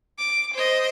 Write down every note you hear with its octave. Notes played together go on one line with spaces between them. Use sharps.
D6
C5 D#5